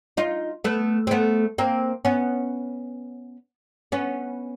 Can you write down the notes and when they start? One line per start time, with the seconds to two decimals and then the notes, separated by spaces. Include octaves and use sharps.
0.17 D#4 F4
0.64 A3 B3
1.07 C4
1.11 A3 B3
1.58 A#3 C4
2.05 B3 C#4
3.92 B3 C#4